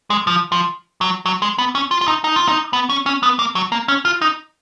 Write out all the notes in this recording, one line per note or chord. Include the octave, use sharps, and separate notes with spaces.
G#3
F3
F3
F#3
F#3
G#3
B3
C#4
F4
F4
D#4
D#4
F4
D#4
B3
C#4
C#4
B3
A#3
F#3
A#3
C#4
F4
D#4